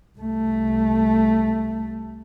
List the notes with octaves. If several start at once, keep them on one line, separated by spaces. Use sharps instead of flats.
C2 A3